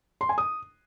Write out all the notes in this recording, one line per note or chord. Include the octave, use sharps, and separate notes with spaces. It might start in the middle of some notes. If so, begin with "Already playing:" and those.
C6
G#5
D#6